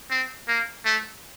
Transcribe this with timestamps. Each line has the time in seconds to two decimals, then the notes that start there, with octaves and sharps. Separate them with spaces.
0.10 C4
0.48 A#3
0.85 A3